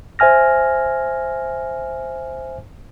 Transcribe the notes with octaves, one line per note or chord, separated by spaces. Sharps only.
C5 E5 G#5 F6 A#6